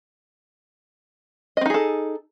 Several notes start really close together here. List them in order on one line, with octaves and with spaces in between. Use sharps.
D#5 C4 D#4 G#4 A4